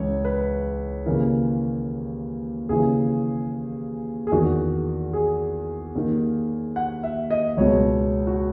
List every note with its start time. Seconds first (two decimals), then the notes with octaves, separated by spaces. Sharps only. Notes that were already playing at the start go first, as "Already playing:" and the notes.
Already playing: C#2 C#3 E3 C#5
0.25 B4
1.06 D#2 C#3 E3 A#4
2.69 D#2 C#3 E3 G#4
4.27 G#4
4.32 E2 D#3 F#4
5.13 G#4
5.95 D#2 D#3
6.76 F#5
7.03 E5
7.31 D#5
7.57 C#2 B2 C#5
8.27 F#4